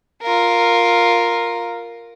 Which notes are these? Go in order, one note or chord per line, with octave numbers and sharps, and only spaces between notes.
F4 A#4